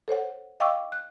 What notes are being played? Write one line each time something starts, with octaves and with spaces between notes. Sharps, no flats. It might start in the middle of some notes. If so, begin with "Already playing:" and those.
A4 C5 C#5 F#5
D#5 F5 G5 C#6 D6 E6
F#6